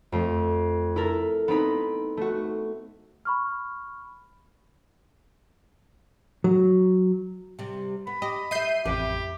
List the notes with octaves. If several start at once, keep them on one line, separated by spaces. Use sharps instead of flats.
F2 A3
E4 A4 A#4
B3 C4 D#4 B5
A3 F#4
B5 C#6 F6
F#3
C3 G3
B3 B5
G4 D#5
D#5 E5 G6 C7 D#7
A1 F2 G4 B4